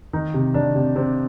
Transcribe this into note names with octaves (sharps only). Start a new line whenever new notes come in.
D#3 D#4
C3
D#3 D4
C3
C3 C4